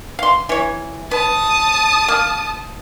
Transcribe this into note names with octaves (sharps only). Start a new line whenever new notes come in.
F5 C6
E3 C#5
B4 A5 D#6
A#3